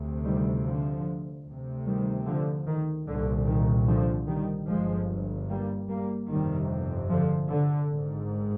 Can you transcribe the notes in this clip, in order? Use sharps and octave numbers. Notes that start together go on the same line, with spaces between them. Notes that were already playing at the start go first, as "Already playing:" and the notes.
Already playing: D2 C3
D#3 G3
D3 F3
D2
C3
D#3 G3
D3 F3
D#3
C2 A#2 D3
D#3
D3 F3
D#3 G3
G1 G2 F3 G#3
G3 A#3
G3 A#3
G1 F2 C3 D#3 G3
D3 F3
D3
G#1 G#2